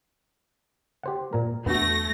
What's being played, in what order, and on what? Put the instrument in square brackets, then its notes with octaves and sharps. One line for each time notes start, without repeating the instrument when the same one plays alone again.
[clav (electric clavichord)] G4 C5 F#5
A#2 A#4
[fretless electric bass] E2 D4 [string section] A3 A#6 [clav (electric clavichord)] B3 F#4